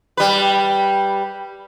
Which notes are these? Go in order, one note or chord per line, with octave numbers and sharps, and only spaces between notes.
G3 B4